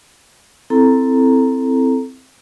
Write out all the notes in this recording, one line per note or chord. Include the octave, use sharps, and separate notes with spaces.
C4 E4 A4 A#5